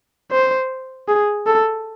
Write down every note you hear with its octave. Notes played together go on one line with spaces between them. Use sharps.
C5
G#4
A4